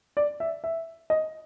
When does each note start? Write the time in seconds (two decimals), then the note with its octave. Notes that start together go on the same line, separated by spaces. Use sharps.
0.17 D5
0.40 E5
0.64 E5
1.10 D#5